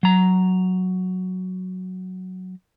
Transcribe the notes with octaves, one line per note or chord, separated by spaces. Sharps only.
F#3 A#5